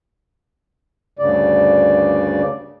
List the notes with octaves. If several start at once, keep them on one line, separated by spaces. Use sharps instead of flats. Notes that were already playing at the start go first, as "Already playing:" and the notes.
D2 G2 C#3 D5